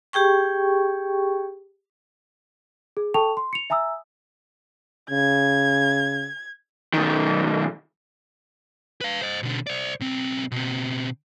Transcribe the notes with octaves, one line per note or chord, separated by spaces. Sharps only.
G4 G#4 G5 C#6
G#4
A4 G5 A5 C#6 F7
C6
C#7 F7
E5 G#5 A#5 D#6 E6
C#3 G#6
B1 D#3
B4 F5
C5 D#5
B2 D3
C5 D5
B1 C4
B2 C4